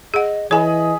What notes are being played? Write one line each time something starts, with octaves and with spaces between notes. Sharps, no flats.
G#4 D#5 F#5
E3 G#4 C#5 D#5 G#5 B5